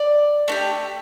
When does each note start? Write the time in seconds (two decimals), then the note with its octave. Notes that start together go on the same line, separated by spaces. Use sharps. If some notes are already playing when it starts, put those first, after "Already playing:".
Already playing: D5
0.48 A3 D#4 G4